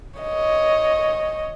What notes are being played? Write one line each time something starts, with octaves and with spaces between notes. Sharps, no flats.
C#5 D#5